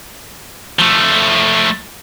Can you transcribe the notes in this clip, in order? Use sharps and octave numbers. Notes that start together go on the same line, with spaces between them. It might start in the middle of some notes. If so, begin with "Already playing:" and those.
F3 A3